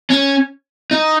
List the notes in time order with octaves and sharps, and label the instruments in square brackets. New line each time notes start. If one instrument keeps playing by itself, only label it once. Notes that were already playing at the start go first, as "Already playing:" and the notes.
[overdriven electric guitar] C#4
D#4